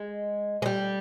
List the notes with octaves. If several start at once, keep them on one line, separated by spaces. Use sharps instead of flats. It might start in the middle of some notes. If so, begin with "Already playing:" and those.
Already playing: G#3
G#3
G3